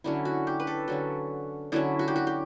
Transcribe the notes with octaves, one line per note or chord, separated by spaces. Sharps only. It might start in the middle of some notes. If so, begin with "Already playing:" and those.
D3 F#3 C#4 E4
F#4
G4
B4
A4
D3 F#3 C#4 F#4
D3 F#3 C#4 E4
F#4
G4
F#4
G4